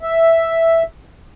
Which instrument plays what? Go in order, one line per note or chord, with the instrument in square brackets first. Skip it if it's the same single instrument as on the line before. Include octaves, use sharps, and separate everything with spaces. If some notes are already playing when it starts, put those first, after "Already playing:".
[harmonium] E5